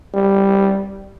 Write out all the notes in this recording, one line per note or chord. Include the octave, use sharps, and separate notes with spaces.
G3